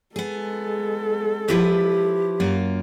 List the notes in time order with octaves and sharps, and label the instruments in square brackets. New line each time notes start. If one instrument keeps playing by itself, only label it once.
[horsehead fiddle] G#3 A4 [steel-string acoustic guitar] B3 G#4
[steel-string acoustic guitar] F3 E4 B4 [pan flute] G4
[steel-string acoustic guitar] F#2 A#3 F4